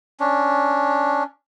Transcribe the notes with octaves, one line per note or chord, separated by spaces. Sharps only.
C#4 D4